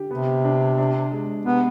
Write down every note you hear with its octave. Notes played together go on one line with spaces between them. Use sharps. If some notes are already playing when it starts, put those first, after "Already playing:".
Already playing: D3 G4
C3 B3
D4
D4
G#3
C3 B3